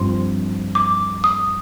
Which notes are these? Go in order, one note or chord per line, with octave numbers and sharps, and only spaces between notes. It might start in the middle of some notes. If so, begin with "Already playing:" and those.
Already playing: G2 F3 C4 C6
D6
D#6